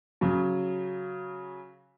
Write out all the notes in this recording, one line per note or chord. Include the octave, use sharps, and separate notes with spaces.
C#3 F#3